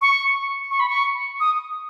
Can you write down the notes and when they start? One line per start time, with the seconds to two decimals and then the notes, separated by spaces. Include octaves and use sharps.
0.02 C#6
0.71 C#6
0.80 B5
0.89 C#6
1.40 D#6